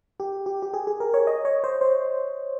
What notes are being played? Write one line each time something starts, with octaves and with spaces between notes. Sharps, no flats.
G4
G4
G4
G#4
G#4
A#4
C#5
D#5
C#5
C5
C5